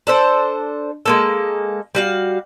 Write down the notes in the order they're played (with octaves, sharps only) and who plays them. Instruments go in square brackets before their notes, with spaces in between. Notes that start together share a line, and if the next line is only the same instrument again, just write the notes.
[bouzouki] D4 A4 C5
G#3 A#3 A4
G3 F#4 F5